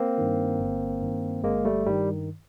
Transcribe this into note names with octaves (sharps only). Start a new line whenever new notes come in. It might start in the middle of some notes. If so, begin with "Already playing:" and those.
Already playing: A#3 C4
G2 D#3
G1
G2 D#3
G1 G#3 A#3
G3 A3
G2 D#3 G3